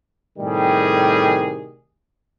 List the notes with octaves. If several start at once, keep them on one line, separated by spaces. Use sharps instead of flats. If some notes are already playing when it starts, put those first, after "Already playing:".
A2 C3 D#3 G3 G#4